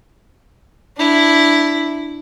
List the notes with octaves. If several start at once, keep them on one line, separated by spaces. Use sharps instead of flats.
D4 E4